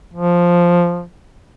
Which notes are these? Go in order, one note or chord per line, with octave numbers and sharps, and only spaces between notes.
F3